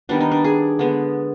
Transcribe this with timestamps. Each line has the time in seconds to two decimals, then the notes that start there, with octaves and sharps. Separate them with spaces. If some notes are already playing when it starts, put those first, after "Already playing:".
0.09 D#3 G3 B3 D4
0.20 D#4
0.31 D4
0.44 G#4
0.79 D3 G#3 B3